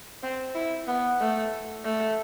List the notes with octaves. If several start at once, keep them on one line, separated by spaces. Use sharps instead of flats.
C4
E4
B3
A3
A3